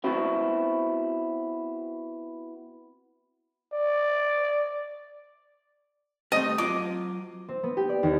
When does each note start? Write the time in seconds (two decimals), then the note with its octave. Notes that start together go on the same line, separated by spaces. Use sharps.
0.04 B3 C4 E4 F#4
3.73 D5
6.32 G3 A3 C4 D#5
6.58 F#3 F4 D#5 D6
7.48 C4
7.63 B3
7.77 G4
7.89 D5
8.03 D#2